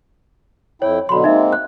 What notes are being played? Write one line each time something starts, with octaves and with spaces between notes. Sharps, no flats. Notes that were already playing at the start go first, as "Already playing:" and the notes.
F2 E4 C#5 G5
B2 D3 F#3 B5 C6
G#3 A#3 C4 D#4 E5
F#6